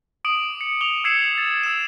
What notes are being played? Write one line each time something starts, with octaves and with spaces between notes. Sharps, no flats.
D6 D#6 D7 F#7
C#7
D6 F7 G7
E6 G#6 C7 C#7 E7
A6
E6 E7